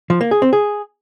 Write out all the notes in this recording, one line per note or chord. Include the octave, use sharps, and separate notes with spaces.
F3
A#3
G#4
C4
G#4